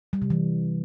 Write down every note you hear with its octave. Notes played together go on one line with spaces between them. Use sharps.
G3
C3
E3